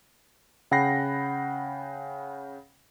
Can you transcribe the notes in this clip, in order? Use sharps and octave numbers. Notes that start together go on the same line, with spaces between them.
C#3 F#5 G5 B5 A#6 C7